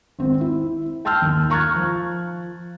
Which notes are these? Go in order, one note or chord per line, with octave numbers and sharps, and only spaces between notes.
G#1 C4
E4
G5 A5 C6 E6 F6 G6
D#2
A#5 C#6 F6 F#6 G#6 A6
F3